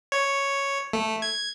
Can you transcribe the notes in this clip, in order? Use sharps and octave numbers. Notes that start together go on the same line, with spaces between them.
C#5
A3
G#6